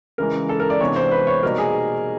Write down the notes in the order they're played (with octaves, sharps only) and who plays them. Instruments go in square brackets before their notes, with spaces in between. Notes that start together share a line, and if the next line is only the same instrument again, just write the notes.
[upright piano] C#3 E3 G#3 A#4
A4
A#4
D5
C3 E3 G#3 B3 D4 C#5
C5
B4
C#5
B2 G3 A#3 D#4 A#4
G#4